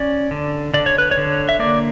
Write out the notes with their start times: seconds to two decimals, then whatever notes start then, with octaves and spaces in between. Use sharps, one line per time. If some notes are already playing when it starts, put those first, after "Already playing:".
Already playing: C#4 D5
0.31 D3
0.74 D3 D5
0.86 C#5
0.98 B4
1.11 C#5
1.18 D3
1.49 E5
1.59 A#3 D5